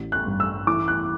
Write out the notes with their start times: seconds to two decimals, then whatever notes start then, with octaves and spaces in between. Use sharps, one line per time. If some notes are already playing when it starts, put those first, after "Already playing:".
Already playing: A1
0.12 F#6
0.26 G2
0.40 E6
0.67 E3 D6
0.88 F#6